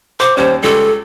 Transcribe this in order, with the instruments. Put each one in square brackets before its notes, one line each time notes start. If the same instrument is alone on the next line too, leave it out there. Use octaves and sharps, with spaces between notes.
[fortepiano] C5 [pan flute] D6
[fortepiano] D#2 G3 C#4 [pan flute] C5
[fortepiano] C#2 G3 [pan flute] A4